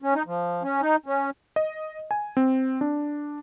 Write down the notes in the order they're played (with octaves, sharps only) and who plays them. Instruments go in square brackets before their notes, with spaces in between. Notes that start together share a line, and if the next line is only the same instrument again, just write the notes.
[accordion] C#4
D#4
F3
C#4
D#4
C#4
[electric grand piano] D#5
G#5
C4
D4